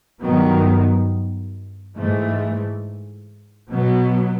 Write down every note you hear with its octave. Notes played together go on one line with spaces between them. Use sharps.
G2 D#3 F#3 B3
G#2 E3 A3
B2 F#3 B3